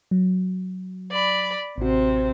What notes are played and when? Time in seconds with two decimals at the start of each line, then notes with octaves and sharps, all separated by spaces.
0.11 F#3
1.10 D5 B5
1.78 A1 C3 C4 F#4